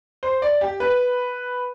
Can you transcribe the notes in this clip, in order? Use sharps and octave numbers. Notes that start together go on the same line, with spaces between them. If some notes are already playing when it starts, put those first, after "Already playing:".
C5
D5
G4
B4